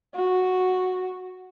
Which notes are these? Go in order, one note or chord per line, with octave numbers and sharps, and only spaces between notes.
F#4